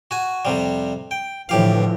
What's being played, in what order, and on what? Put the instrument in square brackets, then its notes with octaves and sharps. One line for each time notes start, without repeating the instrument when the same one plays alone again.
[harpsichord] F#4 G#5
F2 C3 G3
G5
[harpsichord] A2 G4 F5 [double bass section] D3 E3 F3